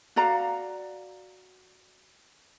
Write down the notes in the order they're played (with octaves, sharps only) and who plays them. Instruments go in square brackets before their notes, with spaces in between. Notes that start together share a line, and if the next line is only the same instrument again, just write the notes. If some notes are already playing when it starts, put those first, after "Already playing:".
[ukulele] F#4 D5 F5 A#5